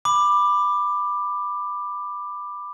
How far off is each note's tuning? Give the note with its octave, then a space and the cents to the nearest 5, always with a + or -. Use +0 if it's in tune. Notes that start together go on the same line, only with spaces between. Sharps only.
B5 +0 D6 +15